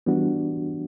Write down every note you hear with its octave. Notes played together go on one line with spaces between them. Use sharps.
E3 G3 B3 D4 F#4